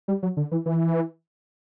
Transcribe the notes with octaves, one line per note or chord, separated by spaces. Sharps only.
G3
F#3
D3
E3
E3